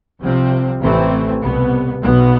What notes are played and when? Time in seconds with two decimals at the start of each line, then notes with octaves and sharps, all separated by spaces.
0.20 C2 C3 F3 C4
0.80 A1 A2 E3 A3 C4
1.42 C2 B2 B3
2.02 B1 B2 B3